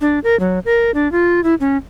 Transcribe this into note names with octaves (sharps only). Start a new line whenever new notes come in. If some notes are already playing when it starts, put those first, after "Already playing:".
D4
A#4
F#3
A#4
D4
F4
E4
C#4